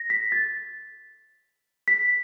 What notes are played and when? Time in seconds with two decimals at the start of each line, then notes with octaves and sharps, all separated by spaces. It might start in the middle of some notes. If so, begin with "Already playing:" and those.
Already playing: A#6
0.10 B6
0.32 A6
1.88 B6